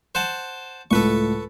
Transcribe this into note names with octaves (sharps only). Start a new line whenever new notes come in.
C5 F#5 A5
C#2 A2 A3 A4 B4 C#6